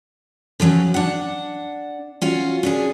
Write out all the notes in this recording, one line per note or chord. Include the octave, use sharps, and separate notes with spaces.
D3 F3 F#3 C#4
D4 F#5
C#4 F4 F#4
C#4 D4 G#4